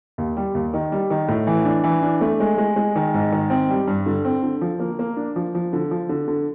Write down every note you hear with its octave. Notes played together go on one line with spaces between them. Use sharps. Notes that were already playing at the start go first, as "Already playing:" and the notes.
D#2
G3
D#2
D#3
G3
D#3
A2
E3
D4
E3
D4
A3
G#3
G#3
G#3
D#3
G#2
D#3
C4
G3
G2
D3
C4
D3
F3
A#3
A#3
D4
F3
F3
D3
F3
D3
D3